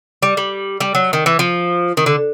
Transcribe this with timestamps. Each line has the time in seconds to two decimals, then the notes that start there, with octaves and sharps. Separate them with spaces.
0.22 G3
0.37 G3
0.80 G3
0.95 F#3
1.13 D#3
1.26 E3
1.39 F3
1.97 D#3
2.06 D3